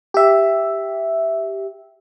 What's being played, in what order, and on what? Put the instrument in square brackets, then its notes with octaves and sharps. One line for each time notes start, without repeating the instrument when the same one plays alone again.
[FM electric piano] G4 E5